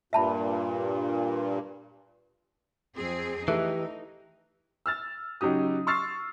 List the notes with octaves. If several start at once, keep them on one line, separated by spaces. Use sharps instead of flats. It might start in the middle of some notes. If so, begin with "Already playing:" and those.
G2 A#2 E5 A5 B5
F2 C4 G#4
E3 A3 D#4 G4 B4
E6 F6 A6
C#3 F#3 D#4 G4 D#6
C6 C#6 E6 F6 A6 C7